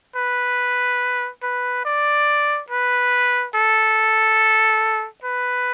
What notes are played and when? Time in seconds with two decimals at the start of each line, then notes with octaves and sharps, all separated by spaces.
0.15 B4
1.42 B4
1.85 D5
2.70 B4
3.55 A4
5.24 B4